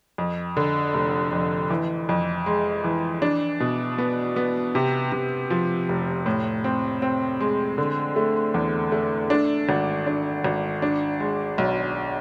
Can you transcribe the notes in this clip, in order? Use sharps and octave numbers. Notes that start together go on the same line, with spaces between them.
F2
D3
F1
F2
E3
F2
G#3
E3
D4
B2
B3
B3
C3
C3
F3
F1
A2
C4
C4
G#3
D3
A3
E2
A3
D4
G#1
D4
G#1
D4
G#3
B1